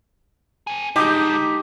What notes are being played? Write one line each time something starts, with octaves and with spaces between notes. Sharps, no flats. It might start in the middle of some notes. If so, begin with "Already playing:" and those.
C4 G#4
D3 G#3 D#4 G4 D#6 G6